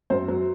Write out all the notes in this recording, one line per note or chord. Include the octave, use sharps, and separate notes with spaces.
F#2 C5
F#3